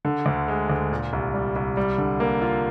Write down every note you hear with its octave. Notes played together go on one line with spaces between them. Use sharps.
D3
D2
G#3
D2
A#2
C2
G3
C2
G3
D3
A#3
F4